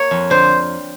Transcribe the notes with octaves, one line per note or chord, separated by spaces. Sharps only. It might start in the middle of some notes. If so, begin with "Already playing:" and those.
Already playing: A#3 C#5
F2
D3 C5